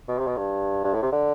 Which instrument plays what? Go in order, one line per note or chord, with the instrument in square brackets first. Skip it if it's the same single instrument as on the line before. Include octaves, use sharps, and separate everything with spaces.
[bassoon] B2
C3
B2
G2
G2
A2
C3
D3